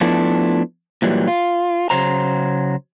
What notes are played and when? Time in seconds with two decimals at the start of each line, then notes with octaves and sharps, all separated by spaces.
0.01 F3 A3 B3 D4 E4
1.02 A#2 E3 F#3 G3
1.28 F4
1.90 C#3 F#3 C5 A#5